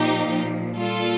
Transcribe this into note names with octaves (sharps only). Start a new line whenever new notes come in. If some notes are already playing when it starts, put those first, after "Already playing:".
Already playing: A#2 F3 D#4 G4
A#2 G3 F4 A4